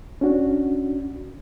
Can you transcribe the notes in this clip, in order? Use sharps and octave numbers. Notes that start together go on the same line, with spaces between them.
C#4 D4 F#4